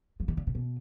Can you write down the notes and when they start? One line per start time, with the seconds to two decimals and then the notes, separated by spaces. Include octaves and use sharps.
0.20 F3
0.28 D#3
0.37 D3
0.47 C3
0.55 B2